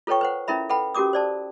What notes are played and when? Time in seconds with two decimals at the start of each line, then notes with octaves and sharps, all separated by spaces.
0.07 F4 A4 B4 C#5 G5 C#6
0.21 B4 C5 F#5
0.48 C#4 E4 A#4 E5 B5
0.70 A4 B4 F#5 G5 B5
0.95 C#4 F#4 G4 A#4 D6 D#6
1.13 C5 D5 A5